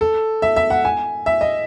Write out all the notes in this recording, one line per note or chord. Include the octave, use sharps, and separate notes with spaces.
A4
E5
E5
F#5
G#5
E5
D#5